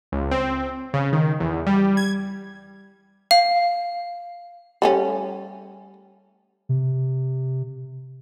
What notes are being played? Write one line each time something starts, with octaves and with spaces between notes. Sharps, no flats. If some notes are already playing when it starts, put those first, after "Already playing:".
C#2
C4
C#3
D#3
E2
G3
G#6
F5
G3 A3 C#4
C3